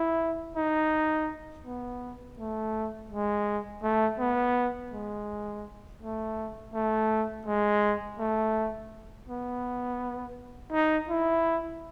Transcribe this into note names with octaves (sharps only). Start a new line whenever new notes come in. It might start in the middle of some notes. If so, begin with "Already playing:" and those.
Already playing: E4
D#4
B3
A3
G#3
A3
B3
G#3
A3
A3
G#3
A3
B3
D#4
E4